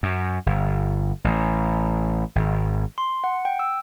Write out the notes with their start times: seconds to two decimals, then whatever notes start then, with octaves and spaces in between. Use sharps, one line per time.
0.03 F#2
0.46 G1
1.24 A1
2.35 G#1
2.98 C6
3.24 F#5
3.45 G5
3.59 E6